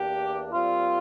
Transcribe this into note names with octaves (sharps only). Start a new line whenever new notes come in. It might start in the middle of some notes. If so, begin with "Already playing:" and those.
Already playing: E2 E3 A#3 D4 G4
A#2 G3 C4 F4